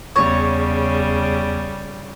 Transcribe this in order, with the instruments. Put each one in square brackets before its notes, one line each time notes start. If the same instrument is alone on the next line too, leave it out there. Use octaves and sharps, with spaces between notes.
[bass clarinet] E2 [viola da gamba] C#3 G3 [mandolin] C#5